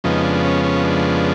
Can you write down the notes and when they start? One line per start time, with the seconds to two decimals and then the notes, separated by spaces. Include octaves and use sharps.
0.04 F2 C#3 F3 G#3 B3 D#4
0.24 D4
0.44 C#4
0.64 C#4
0.85 D4